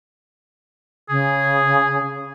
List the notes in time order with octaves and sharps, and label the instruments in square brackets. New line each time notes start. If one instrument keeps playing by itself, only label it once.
[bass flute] C#3 [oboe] G#4